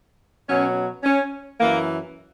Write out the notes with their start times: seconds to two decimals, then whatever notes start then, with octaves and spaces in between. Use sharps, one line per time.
0.48 B2 F#3 C#4
1.04 C#4
1.60 F#2 E3 A#3